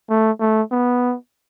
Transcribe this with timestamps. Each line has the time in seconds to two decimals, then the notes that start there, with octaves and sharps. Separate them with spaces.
0.09 A3
0.40 A3
0.72 B3